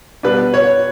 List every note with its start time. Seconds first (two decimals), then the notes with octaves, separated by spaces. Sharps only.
0.23 B2 G3 D4 B4
0.54 C#5